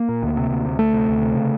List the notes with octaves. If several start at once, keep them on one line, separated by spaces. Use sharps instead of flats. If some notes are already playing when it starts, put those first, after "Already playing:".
Already playing: A#3
A#2
D2
C3
D2
C3
D2 A3
C3
D2
C3
C#3